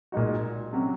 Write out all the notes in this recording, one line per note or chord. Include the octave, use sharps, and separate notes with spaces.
A#2 G#3 D#4 F#4
C3 F#3 C#4